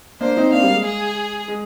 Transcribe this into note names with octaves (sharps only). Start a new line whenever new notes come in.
A#3 D4 C5
C4 D#4
A#3 D4 F5
C4
G3 A#3
G#3
G#4
G#3